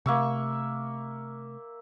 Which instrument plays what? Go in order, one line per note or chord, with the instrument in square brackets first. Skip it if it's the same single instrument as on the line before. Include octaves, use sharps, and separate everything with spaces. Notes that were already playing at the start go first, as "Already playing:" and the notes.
[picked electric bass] C3 A3 [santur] A#3 E5 C#6